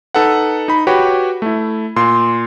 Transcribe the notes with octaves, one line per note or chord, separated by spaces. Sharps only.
D#4 A4 B4 F#5
D#4 B5
F#4 G4 B4 C#5 G5
A3 E4
A#2 C6